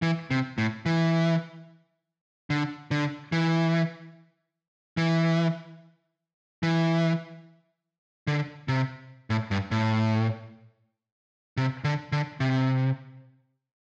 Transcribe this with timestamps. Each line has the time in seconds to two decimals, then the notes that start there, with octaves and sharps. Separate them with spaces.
0.02 E3
0.31 C3
0.58 A2
0.86 E3
2.50 D3
2.91 D3
3.32 E3
4.97 E3
6.63 E3
8.27 D3
8.68 C3
9.30 A2
9.51 G2
9.71 A2
11.57 C3
11.84 D3
12.12 D3
12.40 C3